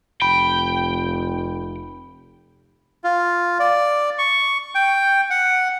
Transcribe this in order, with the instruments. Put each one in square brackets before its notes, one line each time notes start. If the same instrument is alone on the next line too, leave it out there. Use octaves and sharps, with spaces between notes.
[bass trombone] F1 [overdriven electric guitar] G5 [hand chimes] B5
[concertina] F4
D5
C#6
G5
F#5